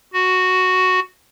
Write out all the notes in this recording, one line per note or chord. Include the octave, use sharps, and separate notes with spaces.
F#4